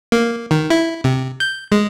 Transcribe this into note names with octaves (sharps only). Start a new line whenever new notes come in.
A#3
D#3
E4
C3
G6
G#3